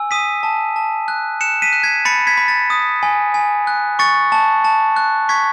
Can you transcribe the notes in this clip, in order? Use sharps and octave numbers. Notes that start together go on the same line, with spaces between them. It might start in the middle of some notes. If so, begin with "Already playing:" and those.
Already playing: G#5 E6
D#6 B6 D#7
A5
A5
F#6
F#6 C#7 E7
B6 D#7
F#6
G#6 B6
B5 A6 C#7
G#6 B6
B5
A6
D#6
G#5
G#5
F#6
C#6 A6 C#7
A5
A5
F#6
C#6 G#6 B6